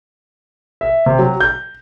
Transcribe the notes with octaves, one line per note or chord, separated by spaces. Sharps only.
E5
C3
F#3
G6